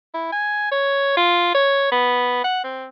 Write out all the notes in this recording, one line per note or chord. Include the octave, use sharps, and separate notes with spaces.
E4
G#5
C#5
F4
C#5
B3
F#5
C4